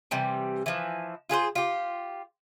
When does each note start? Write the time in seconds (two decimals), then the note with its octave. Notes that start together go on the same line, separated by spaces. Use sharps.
0.11 C3 E3 G3
0.66 E3 F3
1.29 F4 G#4 B4 C5
1.55 F4 G4